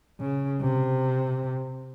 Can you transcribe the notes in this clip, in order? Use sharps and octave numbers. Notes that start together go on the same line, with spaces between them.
C#3
C3